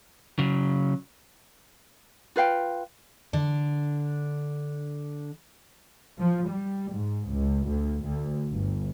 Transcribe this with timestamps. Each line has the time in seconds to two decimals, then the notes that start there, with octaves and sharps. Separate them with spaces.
0.39 C#3 F#3
2.36 F4 B4 F5 G5
3.33 D3 D4
6.20 F3
6.49 G3
6.94 G#2
7.30 C#2
7.68 D2
8.03 D2
8.52 G1